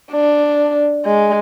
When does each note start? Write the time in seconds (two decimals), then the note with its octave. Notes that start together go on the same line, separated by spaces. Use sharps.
0.12 D4
1.05 G#3